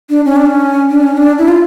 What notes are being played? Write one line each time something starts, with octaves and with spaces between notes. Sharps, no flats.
D4
C#4
D4
C#4
D4
C#4
D4
E4
F4